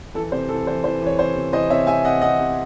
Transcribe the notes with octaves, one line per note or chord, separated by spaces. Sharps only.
E3 A4
C3 C5
E3 A4
E3 C5
E3 C5
E3 C#5
C3 C5
C3
E3 C5 D#5
C3 C#5 E5
C3 E5 G#5
C3 D#5 F#5
C3 D#5 F#5
C3